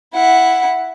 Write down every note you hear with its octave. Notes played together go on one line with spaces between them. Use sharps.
E4 F#5